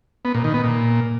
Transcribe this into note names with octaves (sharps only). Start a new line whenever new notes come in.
B3
A#2
D#3
B3
A#2